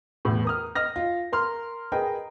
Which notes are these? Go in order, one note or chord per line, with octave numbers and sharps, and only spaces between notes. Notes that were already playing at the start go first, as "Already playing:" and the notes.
E2 A2
A#4 D#6 F6
D#5 F6 A#6
F4
A#4 C6 F6
G#4 A#4 B4 D#5 G5 A#5